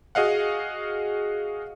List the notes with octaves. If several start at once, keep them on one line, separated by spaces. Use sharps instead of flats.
F#4 G#4 D#5 F5 F#5